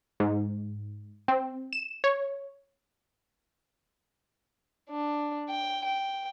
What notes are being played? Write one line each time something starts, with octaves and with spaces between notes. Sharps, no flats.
G#2
C4
E7
C#5
D4
G5
G5